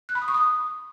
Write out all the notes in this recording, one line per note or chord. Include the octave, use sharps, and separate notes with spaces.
F#6
B5
D#6
C#6
D#6